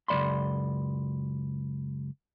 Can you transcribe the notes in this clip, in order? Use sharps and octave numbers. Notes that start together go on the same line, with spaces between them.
C#2 F#2 E3 D5 B5 C6